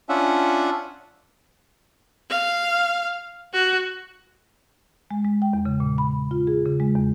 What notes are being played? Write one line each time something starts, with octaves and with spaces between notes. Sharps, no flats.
C#4 D4 F4 E5 F#5
F5
F#4
G#3
G#3
G5
E2
C#3
A#2
B5
F4
G#4
C#3
G#3
E2